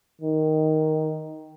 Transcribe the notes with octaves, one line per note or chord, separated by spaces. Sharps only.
D#3